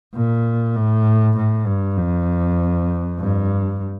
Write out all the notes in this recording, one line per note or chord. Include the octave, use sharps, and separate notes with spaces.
A#2
A2
A2
G2
F2
G2